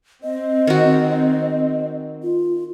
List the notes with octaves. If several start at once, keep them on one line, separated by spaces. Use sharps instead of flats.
C4 D#5
D#3 F#4
F4